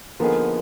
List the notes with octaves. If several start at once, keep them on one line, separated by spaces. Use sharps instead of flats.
D3 F3 A#3 B3 D#4 G#4 A#4